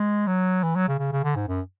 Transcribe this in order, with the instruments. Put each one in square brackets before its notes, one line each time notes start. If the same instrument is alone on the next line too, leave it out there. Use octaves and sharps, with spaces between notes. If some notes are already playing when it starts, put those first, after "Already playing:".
Already playing: [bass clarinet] G#3
F#3
E3
F#3
C#3
C#3
C#3
D3
G#2
F#2